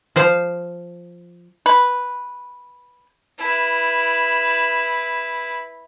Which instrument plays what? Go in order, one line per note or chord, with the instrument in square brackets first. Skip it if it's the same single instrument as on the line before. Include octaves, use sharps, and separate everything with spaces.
[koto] F3 C5 F5
[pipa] B4
[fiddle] E4 B4